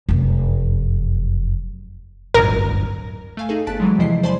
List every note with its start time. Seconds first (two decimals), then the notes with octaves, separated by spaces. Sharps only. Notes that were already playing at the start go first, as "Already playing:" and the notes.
0.09 F1 F#2
2.34 D1 G1 F#2 A#4
3.37 A3 F5 G#5
3.49 D#4 G#4 A4
3.67 G1 A5 F#6 A6 B6 D7
3.80 E3 F#3 G#3
3.98 E2 C3 F3 E4 D#5 C7
4.23 C5 D5 G#5 A5 B5 C6